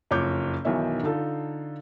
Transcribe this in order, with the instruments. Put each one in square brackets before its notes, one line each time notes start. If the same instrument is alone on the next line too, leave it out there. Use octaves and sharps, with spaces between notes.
[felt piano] F#1 F2 C#5 D6 G6
B1 B2 D#3 E3 C#5 E5
D3 D#4 F4 A4